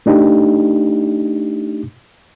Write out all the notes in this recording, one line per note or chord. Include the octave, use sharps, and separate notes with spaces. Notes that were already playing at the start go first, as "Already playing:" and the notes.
A3 D4 D#4 G4